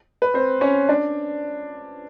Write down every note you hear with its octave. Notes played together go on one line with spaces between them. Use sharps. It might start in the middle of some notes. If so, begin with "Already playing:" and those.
B4
C4 C5
C#4 C#5
D4 D5